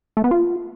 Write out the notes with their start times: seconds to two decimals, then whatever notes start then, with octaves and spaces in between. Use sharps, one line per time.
0.17 A3
0.24 B3
0.31 F4